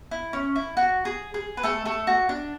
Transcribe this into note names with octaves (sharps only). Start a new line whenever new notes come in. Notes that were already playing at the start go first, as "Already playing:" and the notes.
E4
C#4
E4
F#4
G#4
G#4
B4
A3 A4
A3 A4
F#4
D4